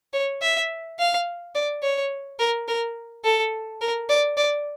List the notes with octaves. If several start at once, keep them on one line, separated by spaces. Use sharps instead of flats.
C#5
E5
F5
D5
C#5
A#4
A#4
A4
A#4
D5
D5